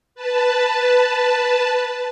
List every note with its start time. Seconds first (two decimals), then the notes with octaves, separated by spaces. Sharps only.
0.15 B4 A5